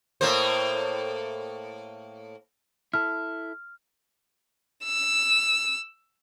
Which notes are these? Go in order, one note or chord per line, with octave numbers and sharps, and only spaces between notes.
A2 A#3 C5
E4 A4 F6
E6